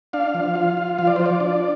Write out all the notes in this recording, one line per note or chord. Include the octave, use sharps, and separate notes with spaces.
D4 F5
F3
F4
F4
F3 F5
D5
F4 C5
D5
D4